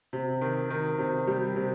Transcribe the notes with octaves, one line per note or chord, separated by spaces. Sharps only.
C3
D#3
D#3
C3
G3
C3